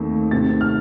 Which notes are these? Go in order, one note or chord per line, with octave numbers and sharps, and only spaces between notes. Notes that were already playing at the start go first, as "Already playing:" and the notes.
Already playing: D#2 D#3 A3 C4
C3 D#3 A3 C4 A6
F6